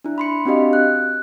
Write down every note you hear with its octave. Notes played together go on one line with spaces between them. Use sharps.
D4 E4
B5 C6 C#7
C4 D4 F#4 G4 D#5 F5
F#6